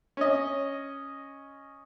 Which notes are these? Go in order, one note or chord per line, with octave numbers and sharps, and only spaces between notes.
C#4 D#5